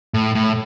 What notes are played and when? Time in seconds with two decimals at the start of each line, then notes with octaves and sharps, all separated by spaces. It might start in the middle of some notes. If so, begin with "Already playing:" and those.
0.14 A2
0.35 A2